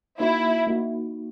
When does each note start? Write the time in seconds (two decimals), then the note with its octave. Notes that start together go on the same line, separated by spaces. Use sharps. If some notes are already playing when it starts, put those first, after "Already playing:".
0.19 A#3 D#4 E4 F#4
0.67 A#3 D#4 F#4